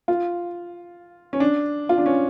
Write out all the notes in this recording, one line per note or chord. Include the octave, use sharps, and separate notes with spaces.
F4
C#4
D4
F4
D4
C#4